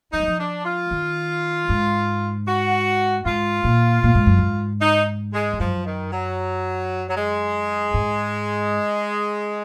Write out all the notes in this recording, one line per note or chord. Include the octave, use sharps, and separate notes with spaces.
F3 D#4
F#3
F3
D4
F4
D#3
G#2
F#4
G#2 F4
A#2
A#2
G#2
F#2
G#2
D#4
G#3
F2
F#2 F3
D#3
F#3
F#3
G#3
G#2